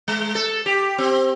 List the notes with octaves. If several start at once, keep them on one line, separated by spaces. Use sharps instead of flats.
G#3
A4
G4
C4